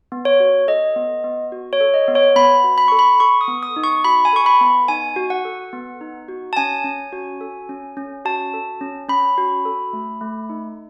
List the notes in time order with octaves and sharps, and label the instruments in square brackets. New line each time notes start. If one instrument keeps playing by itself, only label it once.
[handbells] B3
C#5
F#4
A4 D#5
B3
B3
F#4
C#5
A4
D#5
B3
C#5
B3 B5
F#4
B5
A4 C#6
B5
A4 C#6
D#6
B3
D#6
D#4
C#6
F#4 B5
G#5
A4 C#6
B5
B3
D#4 G#5
F#4
F#5
A4
B3
D#4
F#4
A5
C#4 G#5
C#4
F#4
A4
C#4
C#4
F#4 A5
A4
C#4
C#4 B5
F#4
A4
A3
A3
D#4